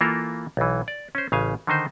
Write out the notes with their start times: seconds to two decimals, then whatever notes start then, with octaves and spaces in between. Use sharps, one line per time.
0.01 E3 A#3 F4 A4 A#4
0.57 B1 E3
0.88 D5
1.15 C#4 C5
1.32 A1 C#3 F5 G#5
1.67 D3 D#3 D#4 C5